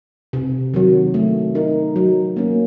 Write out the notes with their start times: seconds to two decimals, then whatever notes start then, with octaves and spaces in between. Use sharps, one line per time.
0.33 C3
0.74 D#3 F#3
1.14 A3
1.55 D#4 A#4
1.96 F#3
2.36 A#3 C#4